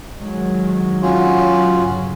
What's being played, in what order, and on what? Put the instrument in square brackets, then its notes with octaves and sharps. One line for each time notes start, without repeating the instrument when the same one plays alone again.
[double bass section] D#3 F#3 G#3
[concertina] C#4 F4 F#4
[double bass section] F#3
G1 C#3 F#3